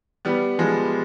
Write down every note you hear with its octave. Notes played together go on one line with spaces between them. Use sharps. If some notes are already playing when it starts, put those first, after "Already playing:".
G3 B3
F3 G#3